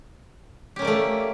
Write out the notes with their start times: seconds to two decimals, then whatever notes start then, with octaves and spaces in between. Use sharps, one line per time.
0.76 G4
0.79 C#4
0.82 A#3
0.85 D5
0.87 A3